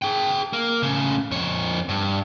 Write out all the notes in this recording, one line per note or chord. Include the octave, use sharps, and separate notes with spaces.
G#4 G5
A#3
A2 C#3
F2 C#5
G2